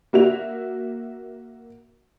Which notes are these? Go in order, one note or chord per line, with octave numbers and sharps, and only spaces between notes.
A#3 F#4 E5 F7